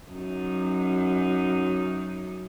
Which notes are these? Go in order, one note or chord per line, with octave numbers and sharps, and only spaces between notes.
F#2 D#4